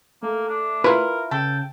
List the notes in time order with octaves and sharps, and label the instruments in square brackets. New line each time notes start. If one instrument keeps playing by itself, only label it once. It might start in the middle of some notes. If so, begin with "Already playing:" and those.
[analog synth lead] A3 [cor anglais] A#3
[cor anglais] D4
[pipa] E4 F4 [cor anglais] A#4 [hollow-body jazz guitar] B4
[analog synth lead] C#3 [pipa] A4 [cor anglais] G5